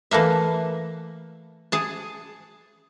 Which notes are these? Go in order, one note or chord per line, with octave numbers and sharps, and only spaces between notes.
E3 A3 A#3 E5
G#4 A5